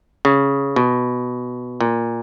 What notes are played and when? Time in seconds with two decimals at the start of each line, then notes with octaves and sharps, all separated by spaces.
0.25 C#3
0.76 B2
1.81 A#2